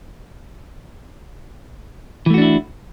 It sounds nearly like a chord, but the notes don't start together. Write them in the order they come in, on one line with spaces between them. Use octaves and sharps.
E3 A3 F#4 D4 E4